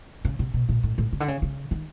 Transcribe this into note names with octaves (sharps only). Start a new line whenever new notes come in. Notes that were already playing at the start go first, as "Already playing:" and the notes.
C#3
C3
B2
A#2
A2
A2
C#3
D3
C#3
C#3
D#3